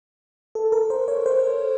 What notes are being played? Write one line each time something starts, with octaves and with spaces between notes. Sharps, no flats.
A4
A#4
C5
C#5
C5